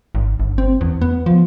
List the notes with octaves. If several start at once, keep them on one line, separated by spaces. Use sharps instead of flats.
G#1
G1
C4
E2
B3
F3